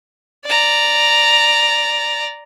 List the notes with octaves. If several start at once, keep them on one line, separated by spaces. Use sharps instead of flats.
D5 A#5